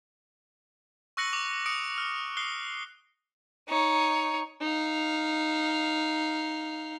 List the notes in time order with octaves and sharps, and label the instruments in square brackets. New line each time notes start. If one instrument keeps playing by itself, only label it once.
[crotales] C#6 E6 F#6 A#6 C#7 F#7
D6 F7 F#7
D#6 C#7 D7
F6
D#6 F#6 C7 G7
[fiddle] D#4 C#5
[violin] D#4 F5